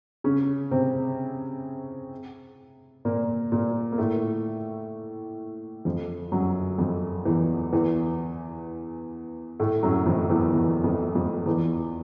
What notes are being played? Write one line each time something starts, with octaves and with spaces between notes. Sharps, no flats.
C#3 C#4
C3 C4
A#2 A#3
A#2 A#3
A#3
A2 A3
F2 F3
F#2 F#3
F2 F3
E2 E3
E2 E3
A2 A3
F#2 F#3
F2 F3
E2 E3
E2 E3
F2 F3
F2 F3
E2 E3